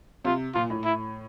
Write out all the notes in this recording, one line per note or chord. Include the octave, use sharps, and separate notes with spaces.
C3 F4
A#2 F4
A2
E4